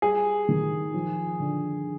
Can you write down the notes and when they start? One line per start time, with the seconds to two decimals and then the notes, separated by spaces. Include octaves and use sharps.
0.02 G3 G#4
0.49 D#3
0.94 F3
1.40 D3